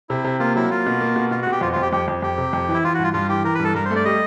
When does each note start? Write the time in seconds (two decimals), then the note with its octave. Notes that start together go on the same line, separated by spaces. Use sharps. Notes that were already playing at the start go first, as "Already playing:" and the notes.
0.09 C3 E4
0.24 C3
0.39 A#3 F4
0.56 F#3 E4
0.70 A#3 F4
0.86 B2
1.01 A#3
1.16 B2
1.31 B2 F4
1.42 F#4
1.47 B2
1.52 G4
1.61 F2 F4
1.72 F2 F4
1.82 G4
1.92 F2 G4
2.08 F2
2.22 F2 G4
2.38 C3
2.53 F2
2.69 E3
2.74 E4
2.84 E3 F4
2.94 F#4
2.99 G2 F4
3.13 G2 F4
3.29 E3 G4
3.44 E3 A#4
3.55 B4
3.60 G2 A4
3.75 G2 A#4
3.85 C5
3.91 A3 D5
4.05 G3 D#5